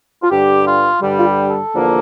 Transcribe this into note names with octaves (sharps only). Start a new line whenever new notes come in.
F4
G2 D3 G3 G4
F4
G2 D3 G3
F4
G4
A4
E2 D3 F3 A#3